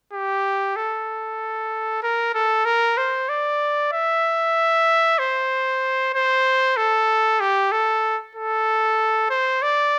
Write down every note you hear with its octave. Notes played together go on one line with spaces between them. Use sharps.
G4
A4
A#4
A4
A#4
C5
D5
E5
C5
C5
A4
G4
A4
A4
C5
D5